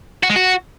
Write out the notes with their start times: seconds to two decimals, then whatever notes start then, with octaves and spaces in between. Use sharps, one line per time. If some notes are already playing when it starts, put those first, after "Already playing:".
0.23 F#4
0.30 G#3
0.36 F#4